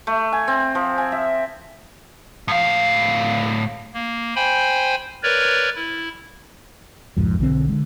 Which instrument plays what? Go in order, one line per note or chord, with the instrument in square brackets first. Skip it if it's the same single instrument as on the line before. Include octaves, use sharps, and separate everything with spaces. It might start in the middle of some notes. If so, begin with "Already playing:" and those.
[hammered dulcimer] A3
G#5
C4
F3
G#5
E5
[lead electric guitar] A2 F5
[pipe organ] A#3
C5 G5 G#5 B5
A#4 B4 C#5 D5
E4
[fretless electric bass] C2 F2 G#2 F3
B1 D3 F#3 C4
D3 G#3